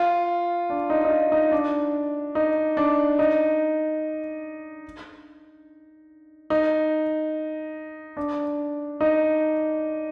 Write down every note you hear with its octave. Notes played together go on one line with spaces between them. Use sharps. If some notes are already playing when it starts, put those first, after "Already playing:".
Already playing: F4
D4
D#4
D#4
F4
D#4
D4
D#4
D4
D#4
D#4
D4
D#4